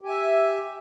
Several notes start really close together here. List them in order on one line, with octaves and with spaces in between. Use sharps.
G4 G#5 E5